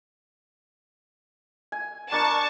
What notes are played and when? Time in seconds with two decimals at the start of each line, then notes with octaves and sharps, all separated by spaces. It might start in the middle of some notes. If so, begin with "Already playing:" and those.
1.72 G#5
2.12 D4 A#4 D5 A5 C#6